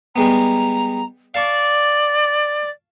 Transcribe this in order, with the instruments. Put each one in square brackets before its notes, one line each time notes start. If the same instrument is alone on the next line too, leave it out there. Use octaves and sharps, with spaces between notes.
[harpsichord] G3 G#3 B3 [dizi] A#5
[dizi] D5 [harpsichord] F5 A5 C#6